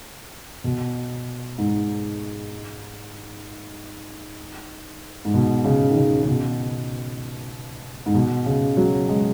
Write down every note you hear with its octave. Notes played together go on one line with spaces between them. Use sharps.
B2
G#2
G#2
B2
C#3
D#3
C#3
C#3
B2
G#2
B2
C#3
F#3
G#3